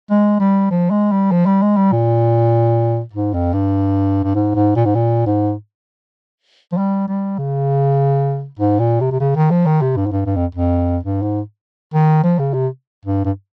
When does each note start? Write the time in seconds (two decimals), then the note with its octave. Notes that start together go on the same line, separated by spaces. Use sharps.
0.10 G#3
0.40 G3
0.70 F3
0.90 G#3
1.11 G3
1.31 F3
1.46 G3
1.62 G#3
1.76 G3
1.92 A#2
3.13 G#2
3.33 F2
3.53 G2
4.23 G2
4.35 G#2
4.55 G#2
4.76 A#2
4.85 G#2
4.95 A#2
5.26 G#2
6.72 F3
6.78 G3
7.08 G3
7.38 C#3
8.59 G#2
8.79 A#2
9.00 C3
9.11 C3
9.20 C#3
9.36 D#3
9.50 F3
9.66 D#3
9.81 C3
9.96 G2
10.06 G#2
10.12 G2
10.26 G2
10.36 F2
10.55 F2
11.03 G2
11.22 G#2
11.94 D#3
12.23 F3
12.39 C#3
12.53 C3
13.05 G2
13.25 G2